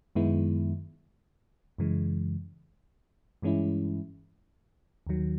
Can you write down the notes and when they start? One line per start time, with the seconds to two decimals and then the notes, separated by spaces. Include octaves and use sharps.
0.15 F#2 D#3 G#3 B3 E4
1.78 F#2 C#3 E3 G#3
3.42 G2 E3 G#3 C#4 E4
5.07 D#2 D#3 F#3